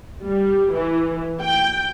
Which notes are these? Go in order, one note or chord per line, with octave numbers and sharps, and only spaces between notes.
G3
E3
G5